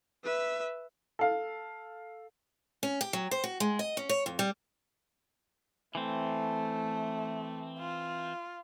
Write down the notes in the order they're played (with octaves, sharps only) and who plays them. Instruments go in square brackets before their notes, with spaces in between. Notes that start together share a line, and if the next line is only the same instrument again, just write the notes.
[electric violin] B4 E5
[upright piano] A4 F5
[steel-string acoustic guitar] C#4
G4
F#3
C5
F#4
G#3
D#5
C#4
C#5
F2
G3
[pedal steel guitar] E3 C4 [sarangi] A3
[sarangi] F4